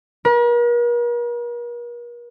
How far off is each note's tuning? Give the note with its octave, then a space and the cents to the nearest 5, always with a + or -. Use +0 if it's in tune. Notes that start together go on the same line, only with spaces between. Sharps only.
A#4 +45